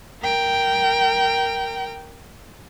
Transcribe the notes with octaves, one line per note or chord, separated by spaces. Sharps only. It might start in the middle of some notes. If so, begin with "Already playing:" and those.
A#4 G5